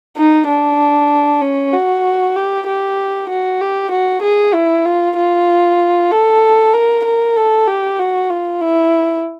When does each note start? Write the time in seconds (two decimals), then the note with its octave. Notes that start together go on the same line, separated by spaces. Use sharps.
0.17 D#4
0.47 D4
1.41 C#4
1.73 F#4
2.36 G4
2.67 G4
3.29 F#4
3.61 G4
3.92 F#4
4.23 G#4
4.54 E4
4.85 F4
5.17 F4
6.11 A4
6.73 A#4
7.05 A#4
7.36 A4
7.67 G4
7.99 F#4
8.30 F4
8.61 E4